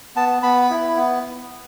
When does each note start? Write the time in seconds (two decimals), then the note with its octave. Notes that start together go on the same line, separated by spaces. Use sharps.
0.16 B3 A5
0.43 B3 B5
0.70 E4
0.97 B3